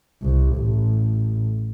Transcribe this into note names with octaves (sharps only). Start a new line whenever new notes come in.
C2
A1